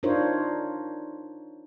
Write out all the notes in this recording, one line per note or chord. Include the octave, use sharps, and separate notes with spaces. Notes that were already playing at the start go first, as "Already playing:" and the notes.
D4 D#4 F4 A#4 C5 C#5